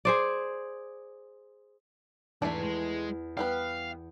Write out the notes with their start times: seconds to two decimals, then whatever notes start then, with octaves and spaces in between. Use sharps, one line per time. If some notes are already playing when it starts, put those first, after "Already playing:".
0.05 G#4 C5 D5
2.42 E2 G#2 A3 D4 G#5
2.62 G#3
3.37 G3 B3 B4 F5